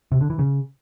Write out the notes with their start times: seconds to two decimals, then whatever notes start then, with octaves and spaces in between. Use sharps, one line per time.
0.12 C3
0.21 D3
0.30 E3
0.39 C#3